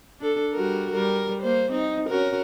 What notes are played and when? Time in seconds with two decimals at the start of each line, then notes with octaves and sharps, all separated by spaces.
0.20 D4 A4
0.53 G3 F#4 A#4
0.93 G3 A#4
1.42 A#3 C5
1.72 C4 D#4
2.09 C#4 F#4 A#4